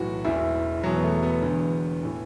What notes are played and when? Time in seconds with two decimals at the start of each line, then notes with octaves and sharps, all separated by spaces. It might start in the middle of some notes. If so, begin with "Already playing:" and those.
Already playing: B1 A2 E3 F#4
0.25 E1 E2 E3 E4
0.83 E1 E2 B2 F#3
0.97 B3
1.03 A3
1.23 B3
1.42 E1 E2 D3
2.03 A2 E3